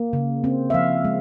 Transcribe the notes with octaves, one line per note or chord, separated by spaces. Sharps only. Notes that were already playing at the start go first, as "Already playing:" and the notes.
Already playing: A#3
C#3
C4
E5
F3 F5
G#3